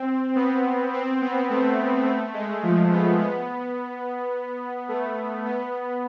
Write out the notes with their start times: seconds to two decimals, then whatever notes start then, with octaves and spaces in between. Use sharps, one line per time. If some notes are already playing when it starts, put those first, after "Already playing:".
Already playing: C4
0.36 B3
0.93 C4
1.22 B3
1.50 A3
2.06 A3
2.34 G#3
2.63 F3
2.92 B3
3.20 B3
4.89 A3
5.45 B3